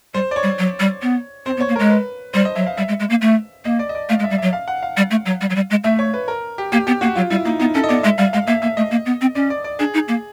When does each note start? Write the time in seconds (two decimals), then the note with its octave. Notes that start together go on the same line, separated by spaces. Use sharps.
0.14 G3 C5
0.31 D5
0.36 C#5
0.43 G3
0.59 F#3
0.80 G3
1.02 B3
1.46 C4 C5
1.57 B3
1.60 C#5
1.69 A#3
1.76 G#3 A#4
1.90 B4
2.34 G3 C5
2.45 D#5
2.55 F#3 E5
2.67 F5
2.78 G3 E5
2.88 G#3
3.00 G#3
3.10 A#3
3.22 A3
3.65 A#3 D#5
3.79 D5
3.89 D#5
3.95 D5
4.09 A3 F5
4.19 G#3
4.24 E5
4.30 G3
4.38 F#3 E5
4.53 F5
4.68 F#5
4.83 F5
4.97 G3
5.11 A3
5.26 F#3
5.41 G3
5.50 F#3
5.56 G3
5.70 G#3
5.84 A3 E5
5.99 C#5
6.14 B4
6.28 A#4
6.58 G4
6.72 A#3 G4
6.87 B3 G4
7.01 A#3 F#4
7.16 F#3 F4
7.30 G3 E4
7.45 A#3 D#4
7.59 B3 D#4
7.74 C#4 A4
7.84 D#5
7.89 B3 D5
8.03 G#3 E5
8.18 G3 F5
8.33 G#3 F5
8.47 A#3 E5
8.62 A#3 E5
8.77 A3 D#5
8.91 A#3
9.06 B3
9.21 C4
9.35 C#4 D5
9.50 D5
9.64 D5
9.79 D4 G#4
9.94 D#4
10.08 A#3